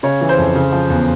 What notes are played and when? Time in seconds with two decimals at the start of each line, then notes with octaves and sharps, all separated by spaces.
0.03 C#3 C#5
0.21 E3
0.29 C5
0.38 F2
0.55 C#3
0.72 F3
0.90 E2